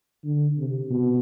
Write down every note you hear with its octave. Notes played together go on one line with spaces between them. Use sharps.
D3
C3
B2